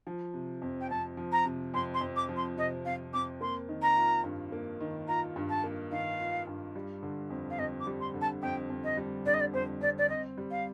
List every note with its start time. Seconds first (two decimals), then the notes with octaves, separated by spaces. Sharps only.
0.07 F3
0.34 C3
0.62 F2
0.81 G5
0.90 F2 A5
1.17 F3
1.32 A#5
1.45 C3
1.74 F2 C6
1.94 C6
2.01 F2
2.16 D6
2.29 F3
2.36 C6
2.57 C3 D#5
2.85 F2 F5
3.13 F2 D6
3.41 A#3 C6
3.69 D#3
3.82 A#5
3.97 F4
4.24 G2
4.52 A#3
4.81 D#3
5.08 F4 A#5
5.36 G2
5.49 A5
5.64 A#3
5.91 D#3 F5
6.20 F4
6.47 G2
6.76 G3
7.03 D3
7.30 F2
7.50 F5
7.58 F2 D#5
7.80 D6
7.87 G3
8.00 C6
8.14 D3
8.21 A5
8.42 F2 G5
8.70 F2
8.83 D#5
8.97 G3
9.25 D3 D5
9.34 D#5
9.40 D5
9.53 F2 C5
9.81 F2 D5
9.98 D5
10.09 C4 D#5
10.38 G3
10.51 F5